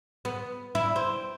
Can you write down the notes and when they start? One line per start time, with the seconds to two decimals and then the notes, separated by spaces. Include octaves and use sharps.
0.25 B3
0.75 E4
0.96 C4